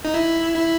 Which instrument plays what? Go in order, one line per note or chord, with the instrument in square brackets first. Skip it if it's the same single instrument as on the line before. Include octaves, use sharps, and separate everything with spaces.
[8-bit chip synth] D#4
E4
E4